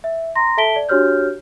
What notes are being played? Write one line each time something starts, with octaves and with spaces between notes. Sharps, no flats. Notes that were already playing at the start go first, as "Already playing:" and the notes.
E5
A#5 C6 A#6
A4 E5 A5 B6 D7 G7
D5
D4 F#4 G4 C#5 F6 G6